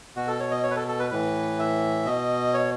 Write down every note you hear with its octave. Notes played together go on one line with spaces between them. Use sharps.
B2 F#4
A4
C#5
D#5
C#5
B4
A4
A4
B4
A2 E3 B4
E5
B2 D#5
C#5